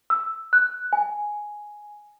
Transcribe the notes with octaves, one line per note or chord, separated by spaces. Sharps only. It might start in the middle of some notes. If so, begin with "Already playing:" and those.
E6
F#6
G#5